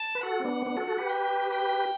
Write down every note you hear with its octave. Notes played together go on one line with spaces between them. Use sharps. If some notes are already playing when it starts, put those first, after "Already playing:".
Already playing: A5
B4
F#4 A4 F#5
C4
B3 D4
C4
B3 D4
F#4 A4
F#4 A4
G4 B4
G5
G5